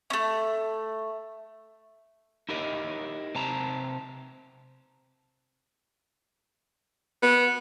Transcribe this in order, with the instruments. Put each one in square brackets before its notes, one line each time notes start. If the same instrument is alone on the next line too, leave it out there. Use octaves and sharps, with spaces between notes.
[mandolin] A3 C#4
[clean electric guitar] D#4 E4 G4 A#4 D#5
C3 C4 A5 A#5
[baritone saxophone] B3